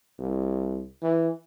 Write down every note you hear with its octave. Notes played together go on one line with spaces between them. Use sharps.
C2
E3